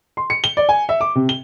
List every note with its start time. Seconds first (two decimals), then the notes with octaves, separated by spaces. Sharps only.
0.17 C6
0.30 C#7
0.44 G7
0.57 D5
0.69 G#5
0.89 E5
1.01 D6
1.15 C3
1.29 G7